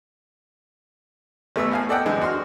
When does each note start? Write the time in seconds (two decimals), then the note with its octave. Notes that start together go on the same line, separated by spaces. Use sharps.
1.56 A1 A3 B3 E6
1.71 A2 F5 G#5
1.89 A4 D5 D#5 F#5 G5
2.06 F#2 D3 E3 G#3
2.21 F#4 C6 F6